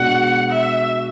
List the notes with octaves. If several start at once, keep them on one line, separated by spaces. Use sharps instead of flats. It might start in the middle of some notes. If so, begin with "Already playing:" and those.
Already playing: B2 G#3 D4 F#4 F#5
E5